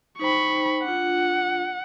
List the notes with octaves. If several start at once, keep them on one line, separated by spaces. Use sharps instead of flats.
D#4 C5 G5 B5 C#6
D4 F4 F#5